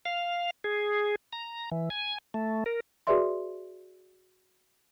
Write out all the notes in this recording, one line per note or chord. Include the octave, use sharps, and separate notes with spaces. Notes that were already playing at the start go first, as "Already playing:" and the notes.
F5
G#4
A#5
E3
G#5
A3
A#4
F#4 G#4 B4 D5 E5 C6